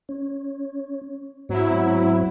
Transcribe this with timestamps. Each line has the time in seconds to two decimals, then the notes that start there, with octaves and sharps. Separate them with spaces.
0.09 C#4
1.49 G#2 F#3 C4 E4